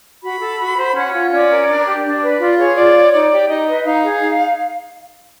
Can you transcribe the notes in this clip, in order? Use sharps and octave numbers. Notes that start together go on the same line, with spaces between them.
F#4 B5
A4
F#4
C5
C#4 F#5
F4
C#4 D5
A#4
D4
G4
D4
B4 D5
F4 D5
G#4 C#5
F4 D5
C#5
D#4 D5
G4
D#4 D#5
B4
D#4 F5
G#4
D#4